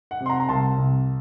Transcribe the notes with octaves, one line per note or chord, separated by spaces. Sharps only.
F#5
C3
C6
F#5 A#5
A#5
C2 A5 C6
C2